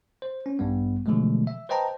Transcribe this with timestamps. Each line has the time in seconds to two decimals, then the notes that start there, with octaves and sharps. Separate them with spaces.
0.22 C5
0.46 C#4
0.59 A1 G2 G3 B3
1.06 B2 D3 E3 F3 G#3 A3
1.47 E5
1.69 B4 C5 D#5 G5 A5 A#5